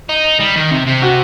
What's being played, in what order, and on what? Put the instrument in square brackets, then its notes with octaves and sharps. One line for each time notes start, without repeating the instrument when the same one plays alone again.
[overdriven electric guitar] D#4
G3
D#3
C3
C3
[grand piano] F#4